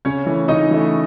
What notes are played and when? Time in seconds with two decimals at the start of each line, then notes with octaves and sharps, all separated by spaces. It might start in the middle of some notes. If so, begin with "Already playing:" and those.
0.05 C#3 C#4 C#5
0.26 E3 A3
0.48 C#3 D#4 D#5
0.70 E3 A3